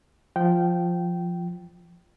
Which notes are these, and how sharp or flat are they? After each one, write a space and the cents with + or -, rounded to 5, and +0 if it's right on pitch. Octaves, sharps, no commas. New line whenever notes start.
F3 +0 G5 -15